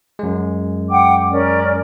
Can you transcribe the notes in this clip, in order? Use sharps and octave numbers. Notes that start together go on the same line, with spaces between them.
F#2 G#3
F#5 G5 D6
C#4 A#4 D5